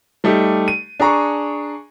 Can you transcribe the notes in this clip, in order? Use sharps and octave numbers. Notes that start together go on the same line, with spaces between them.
G3 A3 D#4 G4
D#7
D4 G#4 A#5 C#6